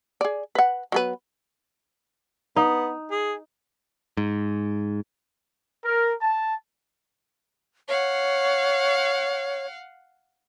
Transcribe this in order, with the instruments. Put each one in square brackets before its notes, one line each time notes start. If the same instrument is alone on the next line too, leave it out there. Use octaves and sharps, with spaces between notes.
[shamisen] G#4 D5
B4 F#5
F#3 B3 B4
[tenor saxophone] B3 [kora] D#4
[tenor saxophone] G#4
[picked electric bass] G#2
[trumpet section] A#4
A5
[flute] C#5 [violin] F5 F#5